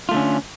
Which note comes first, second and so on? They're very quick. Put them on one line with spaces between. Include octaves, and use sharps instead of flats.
F4 A3 D3 C#4